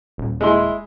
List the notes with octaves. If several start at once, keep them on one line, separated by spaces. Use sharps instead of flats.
D#1
G#3 E4 C6